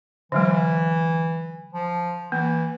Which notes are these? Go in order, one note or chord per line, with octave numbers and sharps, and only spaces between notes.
D3 E3 F#3 G#3
F3
E3 A#3